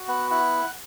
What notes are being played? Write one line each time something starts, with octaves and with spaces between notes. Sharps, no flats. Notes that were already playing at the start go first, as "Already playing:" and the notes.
Already playing: F#4
B3 F#5
E4 F#5